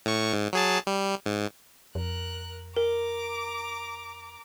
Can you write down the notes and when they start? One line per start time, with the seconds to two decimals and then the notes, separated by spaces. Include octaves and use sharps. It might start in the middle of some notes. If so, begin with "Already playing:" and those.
0.06 A2 C#6
0.33 G#2
0.53 F#3 G#4 A5
0.87 G3
1.26 G#2
1.95 F2 A#4 F#6
2.77 A#4 A#5 D6